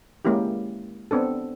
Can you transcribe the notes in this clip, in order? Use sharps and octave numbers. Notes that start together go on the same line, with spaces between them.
G#3 A#3 C#4 E4 G4
B3 C4 D4 A4